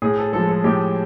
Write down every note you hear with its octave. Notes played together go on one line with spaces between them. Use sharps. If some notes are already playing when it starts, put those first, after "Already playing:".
A2 G#4
A4
F3 G#3 A4
A4
A2 G4